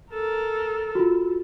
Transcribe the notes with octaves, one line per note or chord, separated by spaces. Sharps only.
A4 A#4
F4 F#4